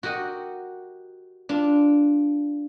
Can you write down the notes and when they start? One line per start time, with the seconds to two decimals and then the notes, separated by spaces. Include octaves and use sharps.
0.03 F#4 G4 A#4 D#5 F#5
1.49 D4 F4